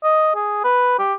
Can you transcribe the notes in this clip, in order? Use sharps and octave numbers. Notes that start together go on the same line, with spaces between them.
D#5
G#4
B4
G4